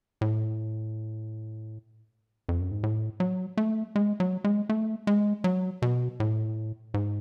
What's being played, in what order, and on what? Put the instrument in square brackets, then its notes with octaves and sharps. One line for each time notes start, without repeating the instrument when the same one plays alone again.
[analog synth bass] A2
F2
F#2
G#2
A2
F#3
A3
G#3
F#3
G#3
A3
G#3
F#3
B2
A2
G#2